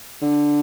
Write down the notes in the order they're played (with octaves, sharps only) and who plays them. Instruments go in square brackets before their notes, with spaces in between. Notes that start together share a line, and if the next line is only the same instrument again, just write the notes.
[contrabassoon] D3